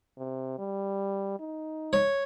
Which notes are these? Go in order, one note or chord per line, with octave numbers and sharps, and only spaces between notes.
C3
G3
D#4
C#5